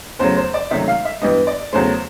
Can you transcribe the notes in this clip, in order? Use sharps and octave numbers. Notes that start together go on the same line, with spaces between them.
E2 C#3 F#3 A3 C5
C5
D5
C#2 C3 D#3 F#3 A3 E5
F5
E5
G2 E3 G3 B3 D#5
D5
E2 C#3 F#3 A3 C5